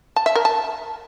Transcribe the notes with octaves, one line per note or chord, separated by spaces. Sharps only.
A5
E5
A#4
A5